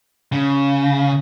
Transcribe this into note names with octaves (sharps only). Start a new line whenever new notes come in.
C#3